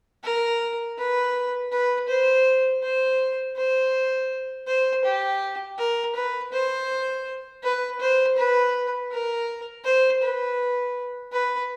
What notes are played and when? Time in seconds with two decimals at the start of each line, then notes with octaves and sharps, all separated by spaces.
0.24 A#4
0.98 B4
1.72 B4
2.09 C5
2.83 C5
3.57 C5
4.67 C5
5.05 G4
5.78 A#4
6.15 B4
6.52 C5
7.63 B4
8.00 C5
8.37 B4
9.11 A#4
9.85 C5
10.22 B4
11.33 B4